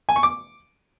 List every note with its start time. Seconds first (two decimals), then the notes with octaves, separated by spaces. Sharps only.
0.09 G#5
0.16 C#6
0.23 D6